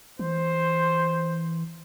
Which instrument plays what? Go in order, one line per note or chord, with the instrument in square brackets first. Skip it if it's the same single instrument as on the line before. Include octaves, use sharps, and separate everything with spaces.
[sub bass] E3 [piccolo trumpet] C5